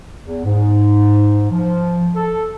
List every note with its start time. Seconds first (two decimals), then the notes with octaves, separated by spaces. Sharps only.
0.22 E2
0.44 G#2
1.51 F3
2.15 A4